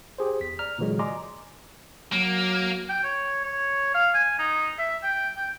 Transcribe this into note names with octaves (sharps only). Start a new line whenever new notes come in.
G4 G#4 C5
E2 B6
D5 A#5 F6
A#2 D3 E3 F#3 G#3
D5 D#5 G#5 A#5 C6 D6
F#3 A#3
G5
C#5
C#5
F5
G#5
D#4
E5
G5
G5